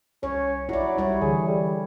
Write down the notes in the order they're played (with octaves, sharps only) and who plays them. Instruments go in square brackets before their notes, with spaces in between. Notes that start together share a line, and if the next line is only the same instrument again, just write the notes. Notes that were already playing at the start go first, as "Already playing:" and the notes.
[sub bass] C2 [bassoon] C#4 [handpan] C#5
[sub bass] A#1 [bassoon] F#3 [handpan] E4 D5
[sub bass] C#2 [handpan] G3 E4 C#5
[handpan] D3 [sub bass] E3 [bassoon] G#4
[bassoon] G3